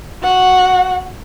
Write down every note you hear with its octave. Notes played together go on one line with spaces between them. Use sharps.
F#4 F#5